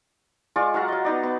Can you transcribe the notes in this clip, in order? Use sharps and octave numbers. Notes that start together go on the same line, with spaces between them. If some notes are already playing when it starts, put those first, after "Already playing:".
G#3 F4 D5 C#6
F#3 F4 F#5 A#5
F#3 D#5
B3 D#4 D5
B3